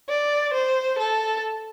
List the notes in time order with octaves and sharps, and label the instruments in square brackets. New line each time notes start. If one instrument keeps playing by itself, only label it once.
[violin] D5
C5
A4